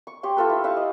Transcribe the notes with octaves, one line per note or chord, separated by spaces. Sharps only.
C#6
G4 C5 C#5 G5
F4 A4 B4
E4
B4 E5 F5 C#6
D#5